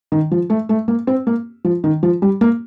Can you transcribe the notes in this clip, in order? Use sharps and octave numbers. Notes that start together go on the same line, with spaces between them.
D#3
F3
A3
A3
A#3
C4
A#3
F3
D#3
F3
G3
A#3